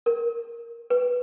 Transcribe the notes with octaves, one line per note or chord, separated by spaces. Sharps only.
A#4
B4